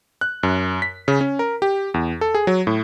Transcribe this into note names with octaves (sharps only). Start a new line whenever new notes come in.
F#6
F#2
B6
C#3
C#4
A#4
G4
E2
A4
G#4
F#3
A2